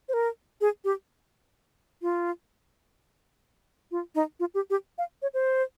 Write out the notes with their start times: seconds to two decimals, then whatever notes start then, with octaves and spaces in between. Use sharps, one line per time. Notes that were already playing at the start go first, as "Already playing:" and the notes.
0.09 C5
0.14 A#4
0.61 G#4
0.84 G4
2.02 F4
3.91 F4
4.15 D#4
4.40 F4
4.54 G4
4.70 G4
4.98 F5
5.22 C#5
5.34 C5